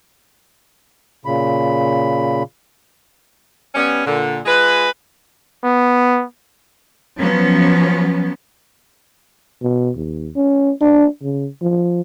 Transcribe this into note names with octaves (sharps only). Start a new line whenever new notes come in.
A#2 C#3 B5
G3 B3 C#4
A#2 D3
G#3 F4 G#4 B4
B3
F3 F#3 B3 C#4
B2
D#2
C#4
D4
C#3
F3